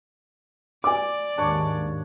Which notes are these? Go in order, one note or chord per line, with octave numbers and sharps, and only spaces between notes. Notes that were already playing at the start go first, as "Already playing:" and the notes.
D5 G#5 D6
D#2 G#2 D4 C#5